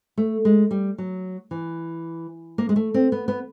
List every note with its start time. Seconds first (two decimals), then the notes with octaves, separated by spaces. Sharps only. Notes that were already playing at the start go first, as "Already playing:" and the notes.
0.17 A3
0.45 G#3
0.71 G3
0.98 F#3
1.51 E3
2.58 A#3
2.69 G#3
2.76 A3
2.94 C4
3.12 B3
3.28 B3